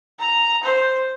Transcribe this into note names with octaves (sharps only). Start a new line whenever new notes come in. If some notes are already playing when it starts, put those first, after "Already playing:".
A#5
C5